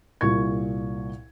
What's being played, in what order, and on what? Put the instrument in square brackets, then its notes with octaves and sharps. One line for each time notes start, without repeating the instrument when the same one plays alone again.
[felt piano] C2 A#2 C#6 G#6